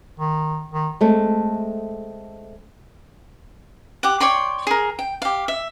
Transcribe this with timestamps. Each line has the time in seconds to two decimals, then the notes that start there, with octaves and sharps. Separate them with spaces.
0.20 D#3
0.72 D#3
1.01 G#3 A3 C4
4.03 G4 F#5
4.20 C#5 D5 G5 C6
4.67 G#4 A#4
4.99 G5
5.22 G4 F5
5.48 E5